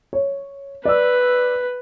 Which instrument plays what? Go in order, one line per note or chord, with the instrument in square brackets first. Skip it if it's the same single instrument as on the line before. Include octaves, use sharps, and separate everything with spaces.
[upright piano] C#5
[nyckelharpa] B4 [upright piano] D5 E6